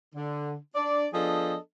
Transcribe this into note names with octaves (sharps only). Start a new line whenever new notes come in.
D3
D4 D5
F3 B3 D4 G#4 A4 D#5